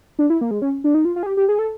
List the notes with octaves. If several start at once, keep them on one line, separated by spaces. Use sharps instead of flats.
D4
E4
A#3
G#3
C#4
D4
D#4
F4
F4
G#4
G4
G4
G#4
A4